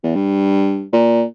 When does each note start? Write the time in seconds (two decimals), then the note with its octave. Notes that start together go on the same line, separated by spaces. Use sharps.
0.03 E2
0.15 G2
0.93 A#2